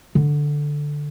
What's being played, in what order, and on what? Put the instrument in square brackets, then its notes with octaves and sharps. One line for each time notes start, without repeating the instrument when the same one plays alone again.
[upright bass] D3